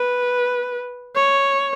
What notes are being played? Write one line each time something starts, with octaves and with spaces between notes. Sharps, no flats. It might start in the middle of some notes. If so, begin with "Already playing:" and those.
Already playing: B4
C#5